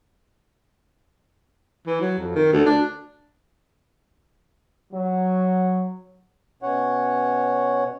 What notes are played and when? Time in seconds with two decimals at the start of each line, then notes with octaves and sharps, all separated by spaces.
1.87 E3
2.01 F#3
2.19 F2
2.35 D#3
2.53 D2
2.66 D4
4.93 F#3
6.63 B2 C#4 C#5 F#5